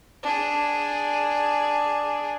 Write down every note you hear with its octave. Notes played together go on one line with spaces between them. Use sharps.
D4 G#4